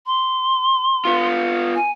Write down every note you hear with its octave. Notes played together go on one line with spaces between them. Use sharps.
C6
B3 F4
G#5